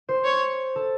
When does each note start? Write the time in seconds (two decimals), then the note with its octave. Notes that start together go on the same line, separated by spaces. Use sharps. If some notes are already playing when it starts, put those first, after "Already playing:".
0.09 C5
0.25 C#5
0.75 A4